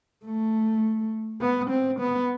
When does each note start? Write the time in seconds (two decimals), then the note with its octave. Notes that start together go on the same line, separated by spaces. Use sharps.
0.25 A3
1.41 B3
1.70 C4
2.00 B3